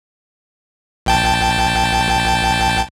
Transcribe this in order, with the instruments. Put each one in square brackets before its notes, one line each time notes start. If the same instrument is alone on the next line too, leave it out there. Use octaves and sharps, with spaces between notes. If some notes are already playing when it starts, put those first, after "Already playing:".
[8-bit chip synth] A#1 G5 A5